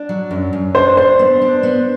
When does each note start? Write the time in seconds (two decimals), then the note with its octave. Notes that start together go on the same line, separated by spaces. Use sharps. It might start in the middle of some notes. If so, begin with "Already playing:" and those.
Already playing: D4
0.09 F#3
0.31 F#2
0.53 F#2
0.75 D4 C5
0.97 D4 C5
1.19 B3
1.42 D4
1.63 B3